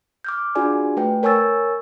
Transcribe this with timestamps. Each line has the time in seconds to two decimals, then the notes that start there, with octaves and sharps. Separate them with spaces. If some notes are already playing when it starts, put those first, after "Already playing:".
0.24 D6 F6 G6
0.55 D4 F4 F#4 G#4 D5 G#5
0.97 A3 B4 G5
1.23 A#4 C#5 G#5 C#6 E6 A6